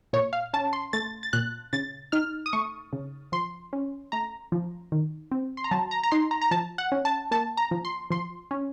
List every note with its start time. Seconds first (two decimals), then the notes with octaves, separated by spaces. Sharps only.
0.13 A#2 C#5
0.33 F5
0.53 C#4 A5
0.73 C6
0.93 A3 A6
1.23 A6
1.33 A#2 F#6
1.73 C#3 A6
2.12 D#4 F6
2.46 D#6
2.53 A3 C#6
2.93 C#3
3.32 F3 C6
3.73 C#4
4.12 A3 A#5
4.52 F3
4.92 D#3
5.31 C4
5.57 C6
5.64 A#5
5.71 F#3 A5
5.91 A#5
6.03 A#5
6.12 D#4 C6
6.31 A#5
6.41 A#5
6.51 F3 A5
6.78 F#5
6.92 C#4
7.05 A5
7.31 A#3 A5
7.57 A#5
7.71 F3
7.85 C6
8.10 F3 C6
8.51 C#4